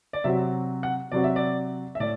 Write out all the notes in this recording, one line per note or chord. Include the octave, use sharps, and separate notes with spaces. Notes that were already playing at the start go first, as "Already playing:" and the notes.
D5
C3 F#3 C4 F#4 E5
F#5
C3 F#3 C4 F#4 D5
E5
D5
E5
A2 D5